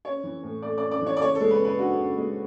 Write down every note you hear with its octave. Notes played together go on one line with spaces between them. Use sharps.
C#4 C#5
E3
A2
A3 D5
C#4 D5
D5
E3 C#5
D5
C#3 C#5
A4
G#3
B4
C#3
B4
D4 F#4
C#3
G#3